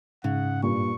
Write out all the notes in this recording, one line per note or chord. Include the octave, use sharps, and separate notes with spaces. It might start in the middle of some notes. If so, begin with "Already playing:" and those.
G#2 C#3 F#5
G2 A#2 C#6